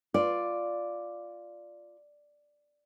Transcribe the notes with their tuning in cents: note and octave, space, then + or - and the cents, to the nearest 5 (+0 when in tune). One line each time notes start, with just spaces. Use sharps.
F4 +0 D5 +0